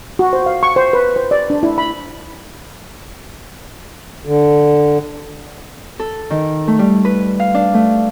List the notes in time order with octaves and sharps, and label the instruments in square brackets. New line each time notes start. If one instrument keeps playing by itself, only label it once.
[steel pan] F#4
C5
F5
C#6
C5
B4
C5
D5
D4
E4
B5
[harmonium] D3
[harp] A4
D#3
A3
G3
B4
F5
D4
A3